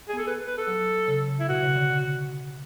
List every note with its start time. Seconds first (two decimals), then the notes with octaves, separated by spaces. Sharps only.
0.09 G#4
0.13 B3
0.18 A4
0.27 B4
0.47 B4
0.58 A4
0.67 F#3
1.08 C#3
1.28 C#3
1.40 E4
1.49 B2 F#4
1.63 C#3
1.76 D3